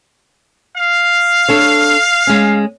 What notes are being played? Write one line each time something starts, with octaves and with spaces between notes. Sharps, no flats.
F5
D4 A4 C#5
G#3 C#4